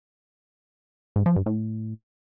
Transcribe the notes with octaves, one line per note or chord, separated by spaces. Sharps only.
G#2
F3
G2
A2